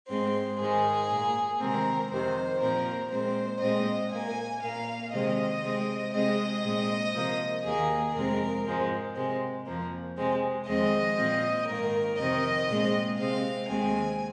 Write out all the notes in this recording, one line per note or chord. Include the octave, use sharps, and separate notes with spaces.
G#2 G#3 C4 C5
G#2 D#3 G#3 G#4
A#2 A#3
C3 D#3 G#3 C4 A#4
F2 C3 D#3 C5
A#2 F3 C4 A#4
A#2 G#3 C4 C5
A#2 G#3 C4 D#5
A#2 A#3 G#5
A#2 A#3 F5
C3 D#3 G#3 C4 D#5
C3 G#3 C4
C3 G#3 C4 D#5
A#2 G#3 C4
C3 F3 A#3
D#2 D#3 A#3 G#4
F2 C3 F3 G#3 C4 A#4
G#2 F3 G#3 C4
C3 G#3 C4
F2 F3 A#3
C3 G#3 C4
F2 D#3 G#3 C4 D#5
A#2 F3 C4
G#2 D#3 A#3 A#4
F2 C3 D#3 C4 D#5
A#2 G#3 C4
C3 G#3 C4 F5
D#2 D#3 G#3 C4 G#5